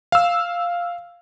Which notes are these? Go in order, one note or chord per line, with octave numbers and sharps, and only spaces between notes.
F5 E6